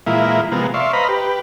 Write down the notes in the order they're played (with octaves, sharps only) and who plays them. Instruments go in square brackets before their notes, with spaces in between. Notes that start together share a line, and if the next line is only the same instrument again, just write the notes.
[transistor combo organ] A#2 E3 G#3 A#3 E4 F4
C3 F3 G#3 A#3 B3
D5 E5 F5 C6 C#6
B4 C5 D#5 F5 A#5 B5
G4 B4